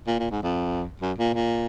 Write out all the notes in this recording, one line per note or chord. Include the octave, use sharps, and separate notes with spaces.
A#2
A#2
G#2
F2
F#2
A#2
A#2